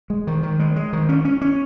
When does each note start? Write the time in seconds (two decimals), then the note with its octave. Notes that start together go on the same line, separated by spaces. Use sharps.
0.10 G#3
0.27 D#3
0.43 D#3
0.60 G#3
0.76 G#3
0.93 D#3
1.09 C#4
1.25 C#4
1.41 C#4